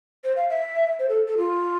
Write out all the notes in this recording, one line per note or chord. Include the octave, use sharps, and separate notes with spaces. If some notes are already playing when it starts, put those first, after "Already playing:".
C5
F5
E5
C5
A4
A4
F4